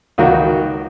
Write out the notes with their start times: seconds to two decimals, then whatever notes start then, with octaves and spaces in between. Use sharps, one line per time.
0.18 C#2 D#3 F#4